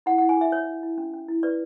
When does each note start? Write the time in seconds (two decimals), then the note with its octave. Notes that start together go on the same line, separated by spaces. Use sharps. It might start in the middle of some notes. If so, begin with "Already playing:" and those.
0.06 E4 F#5
0.18 E4 F#5
0.29 G#5
0.37 G#4 E5
0.52 C#5
0.67 E4
0.83 E4
0.98 C#4
1.14 C#4
1.28 E4
1.43 B4 D5